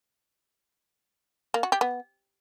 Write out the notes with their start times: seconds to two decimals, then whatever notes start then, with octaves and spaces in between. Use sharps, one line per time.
1.54 A#3
1.63 F#4
1.72 G4
1.81 B3